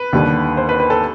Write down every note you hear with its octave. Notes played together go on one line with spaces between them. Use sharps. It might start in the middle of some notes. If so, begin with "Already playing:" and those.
Already playing: B4
D#2 D3 G3
C5
B4
B4
A4